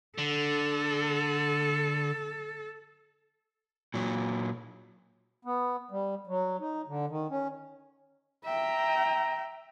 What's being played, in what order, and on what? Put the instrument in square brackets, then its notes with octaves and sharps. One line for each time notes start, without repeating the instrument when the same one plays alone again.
[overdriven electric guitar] D3 [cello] A4
[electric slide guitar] A#2 F#3
[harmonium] B3
G3
F#3
D#4
D3
D#3
C#4
[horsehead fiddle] E5 G5 [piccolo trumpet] A#5